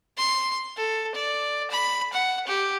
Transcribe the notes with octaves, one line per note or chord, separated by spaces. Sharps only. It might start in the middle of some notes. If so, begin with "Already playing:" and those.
C6
A4
D5
B5
F#5
G4